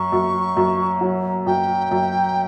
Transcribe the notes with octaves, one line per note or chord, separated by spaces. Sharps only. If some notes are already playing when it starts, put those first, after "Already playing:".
Already playing: F#2 C#6
F#2
F#2
F#3
F#2 G5
F#2